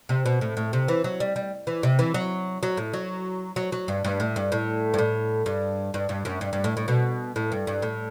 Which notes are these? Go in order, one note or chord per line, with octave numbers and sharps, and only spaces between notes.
C3
B2
A2
A2
C3
E3
F#3
G3
G3
E3
C3
E3
F#3
F#3
A2
F#3
F#3
F#3
G2
G2
A2
G2
A2
G2
A2
G2
G2
G2
F#2
G2
G2
A2
A2
B2
A2
G2
G2
A2